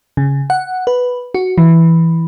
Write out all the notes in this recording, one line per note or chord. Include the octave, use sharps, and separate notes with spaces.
C#3
F#5
B4
F#4
E3